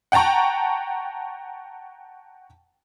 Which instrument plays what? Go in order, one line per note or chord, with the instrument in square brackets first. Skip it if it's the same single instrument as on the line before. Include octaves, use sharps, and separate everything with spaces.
[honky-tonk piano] F#5 G5 A5 A#5 C#6